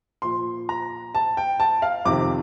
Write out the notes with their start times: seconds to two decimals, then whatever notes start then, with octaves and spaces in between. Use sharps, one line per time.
0.22 A#2 F3 C6
0.69 A#5
1.15 A5
1.37 G5
1.60 A5
1.82 F5
2.05 F2 C3 D#3 D6